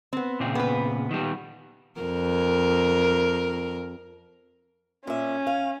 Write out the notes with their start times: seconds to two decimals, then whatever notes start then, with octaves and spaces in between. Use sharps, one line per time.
0.13 B3 C4
0.40 A#2 C#3 C4
0.55 B3 B4
1.11 D#3 G3
2.01 F2 A#4
5.07 A#2 C#4 E5
5.47 F5